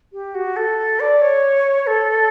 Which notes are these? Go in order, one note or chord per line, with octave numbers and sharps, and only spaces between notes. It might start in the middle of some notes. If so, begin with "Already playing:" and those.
G4
F#4
A4
D5
C#5
A4